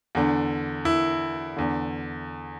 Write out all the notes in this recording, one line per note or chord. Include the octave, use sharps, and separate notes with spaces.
E2 D3
E4
E2 D3